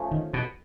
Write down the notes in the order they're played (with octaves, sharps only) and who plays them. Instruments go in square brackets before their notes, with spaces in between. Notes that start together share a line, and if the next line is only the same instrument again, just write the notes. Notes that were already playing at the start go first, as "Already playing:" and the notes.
Already playing: [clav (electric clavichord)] F3 A3 C#4
[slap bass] D#3
B2